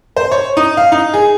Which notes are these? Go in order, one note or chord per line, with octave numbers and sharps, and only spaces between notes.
C5
C#5
D#4
F5
D#4
G#4